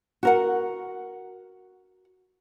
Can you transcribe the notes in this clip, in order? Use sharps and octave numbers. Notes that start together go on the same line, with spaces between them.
F#4 A#4 F#5